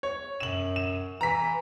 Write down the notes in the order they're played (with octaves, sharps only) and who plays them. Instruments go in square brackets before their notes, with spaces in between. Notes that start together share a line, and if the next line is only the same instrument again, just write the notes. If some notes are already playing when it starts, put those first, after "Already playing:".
[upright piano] C#5
[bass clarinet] F#2 [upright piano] E7 F#7
[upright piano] E7
[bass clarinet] E3 [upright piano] A#5 B6